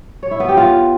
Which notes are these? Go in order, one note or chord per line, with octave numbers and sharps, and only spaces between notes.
C#5
E4
B3
G4
F4